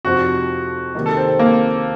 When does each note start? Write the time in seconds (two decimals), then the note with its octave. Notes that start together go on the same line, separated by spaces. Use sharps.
0.05 F2 C3 F3 C4 D#4 F#4
0.95 C3 D#3 A#3 D#4
1.06 A4
1.17 C4
1.39 A#3